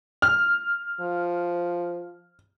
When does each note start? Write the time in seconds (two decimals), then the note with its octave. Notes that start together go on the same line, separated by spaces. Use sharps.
0.22 F6
1.01 F3